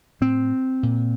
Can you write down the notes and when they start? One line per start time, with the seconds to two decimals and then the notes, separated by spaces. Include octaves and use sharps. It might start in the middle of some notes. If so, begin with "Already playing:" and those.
0.21 A2 C4
0.83 A#2